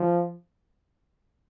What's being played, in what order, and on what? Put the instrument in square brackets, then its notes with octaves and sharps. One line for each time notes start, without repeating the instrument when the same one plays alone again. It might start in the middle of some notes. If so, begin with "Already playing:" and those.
Already playing: [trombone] F3